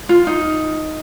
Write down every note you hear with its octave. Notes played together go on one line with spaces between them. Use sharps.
F4
D#4